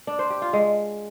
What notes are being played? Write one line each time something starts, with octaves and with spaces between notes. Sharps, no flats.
D4
C5
G4
F4
G#3